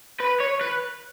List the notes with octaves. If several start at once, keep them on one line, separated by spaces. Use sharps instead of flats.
B4
C#5
B4